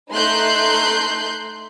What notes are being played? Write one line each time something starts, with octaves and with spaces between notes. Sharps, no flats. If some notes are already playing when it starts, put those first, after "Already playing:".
A3 D#4 C6 F#6 G6